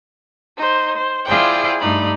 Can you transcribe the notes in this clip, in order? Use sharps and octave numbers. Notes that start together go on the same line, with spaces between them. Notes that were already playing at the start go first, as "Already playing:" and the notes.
D#4 C5
C5
E4 F4 G#4 C5 D5 G5
G2 A3 D#4 D5 B5